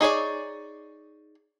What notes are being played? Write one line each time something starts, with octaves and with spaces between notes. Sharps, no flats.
D#4 G#4 C#5 D5